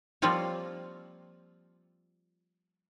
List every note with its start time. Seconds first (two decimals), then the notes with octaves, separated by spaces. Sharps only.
0.22 F3 G3 A#3 C4 F4 C#5